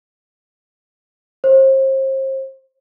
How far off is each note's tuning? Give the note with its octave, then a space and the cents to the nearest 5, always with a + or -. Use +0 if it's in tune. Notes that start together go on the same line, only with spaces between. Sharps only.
C5 +35